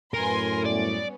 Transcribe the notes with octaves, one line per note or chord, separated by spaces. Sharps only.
F#2 A2 A#4 B4 G#5 C6
G3 B3 C#4 D5